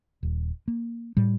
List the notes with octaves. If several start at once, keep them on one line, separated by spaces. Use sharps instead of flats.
D#1
A#3
A2 G3